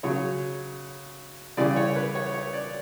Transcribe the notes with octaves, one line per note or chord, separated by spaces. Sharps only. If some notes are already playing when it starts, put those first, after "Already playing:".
C#3 F#3 C#5
C#3 E3 G3 D5
C#5
B4
C#5
C#5
D5